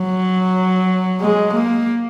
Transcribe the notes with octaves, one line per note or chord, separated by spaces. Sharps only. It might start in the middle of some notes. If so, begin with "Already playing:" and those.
Already playing: F#3
G#3
A#3